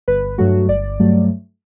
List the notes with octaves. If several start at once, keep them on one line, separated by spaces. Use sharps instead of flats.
G1 B4
G2 F#3 A3 F#4
G1 D5
G2 F#3 A3